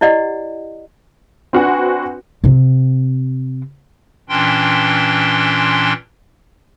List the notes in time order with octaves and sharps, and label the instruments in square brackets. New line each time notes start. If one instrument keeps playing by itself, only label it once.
[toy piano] E4 G4 D5 D#5 F#5
[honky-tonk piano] C4 D4 F#4 B4 F#5 G#5
[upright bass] C3 C4
[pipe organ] A#2 E3 C#4 D4 G5 C6